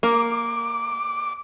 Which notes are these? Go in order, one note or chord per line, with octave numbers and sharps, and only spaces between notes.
A#3 D6